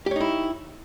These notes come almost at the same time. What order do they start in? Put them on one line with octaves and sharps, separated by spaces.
G4 C#5 D#4 E4